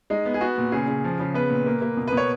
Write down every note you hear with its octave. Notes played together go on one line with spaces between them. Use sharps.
G#3 D#4
B3
G#4
B3 F#4
A#2
C#3 G#4
C#3
F3
C#3
B3 B4
A#2
A#3
A#3
B2
B4
B2
C#5